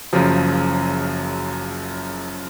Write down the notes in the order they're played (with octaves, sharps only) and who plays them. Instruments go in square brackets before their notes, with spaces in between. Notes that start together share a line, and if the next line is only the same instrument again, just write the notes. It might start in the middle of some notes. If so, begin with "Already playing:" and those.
[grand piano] F#1 F#2 C#3 F3